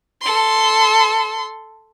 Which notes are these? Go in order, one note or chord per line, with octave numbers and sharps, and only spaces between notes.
A4 C6